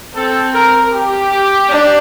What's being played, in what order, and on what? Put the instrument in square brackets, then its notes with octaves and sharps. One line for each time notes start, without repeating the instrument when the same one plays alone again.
[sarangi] C4 [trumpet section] A4
[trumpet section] A#4
G4
[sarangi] D4